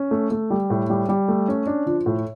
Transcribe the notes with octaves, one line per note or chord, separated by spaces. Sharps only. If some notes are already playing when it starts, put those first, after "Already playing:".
Already playing: C#4
A3
A3
G3
A2
G3
G3
A3
C#4
D4
F3
A2